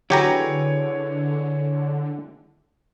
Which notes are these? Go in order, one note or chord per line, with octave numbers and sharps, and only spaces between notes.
D3 F#3 E4 G4 G#4 B4 C#5 A#5